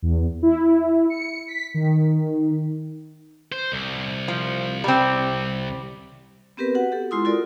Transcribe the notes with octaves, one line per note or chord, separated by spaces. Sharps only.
E2
E4
C#7
B6
D#3
C5
C2
F3
G3 C4
B3 C4 G4 A#4 B4
F#4 F#5
G4 A4
G#3 E4 F4 C6 D#6
F4 F#4 A4 A#4 D5